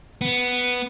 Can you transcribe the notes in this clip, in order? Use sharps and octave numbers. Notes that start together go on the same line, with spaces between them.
B3